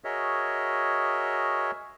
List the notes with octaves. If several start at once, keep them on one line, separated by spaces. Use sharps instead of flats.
F#4 G#4 A#4 C#5 D#5 E5